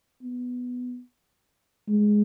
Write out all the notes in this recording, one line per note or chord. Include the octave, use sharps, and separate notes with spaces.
B3
G#3